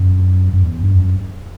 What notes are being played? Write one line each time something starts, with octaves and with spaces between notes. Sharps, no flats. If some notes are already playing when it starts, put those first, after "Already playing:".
Already playing: F#2
F#2
E2
G2
F#2